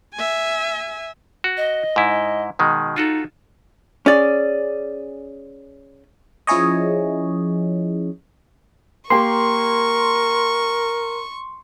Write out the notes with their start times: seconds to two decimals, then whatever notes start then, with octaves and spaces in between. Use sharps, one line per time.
0.14 E5 G#5
1.44 F#4
1.57 D#5
1.96 G#2 E4
2.59 B2 D#3 G#3
2.96 D#4 F4 F#4 A4
4.06 C#4 G#4 D5
6.47 F3 C#4 E4 G#4 C#5 D#5
9.10 A#3 G4 A#4 C6 C#6